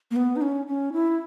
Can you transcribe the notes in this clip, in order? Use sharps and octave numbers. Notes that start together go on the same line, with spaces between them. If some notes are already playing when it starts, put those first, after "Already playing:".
A#3
B3
D#4
C#4
C#4
E4